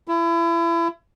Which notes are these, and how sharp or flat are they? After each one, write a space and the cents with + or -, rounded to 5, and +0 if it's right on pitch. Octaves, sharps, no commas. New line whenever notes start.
E4 +30